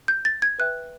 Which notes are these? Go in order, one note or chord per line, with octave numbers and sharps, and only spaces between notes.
G6
A6
G#6
B4 E5 G5 F#6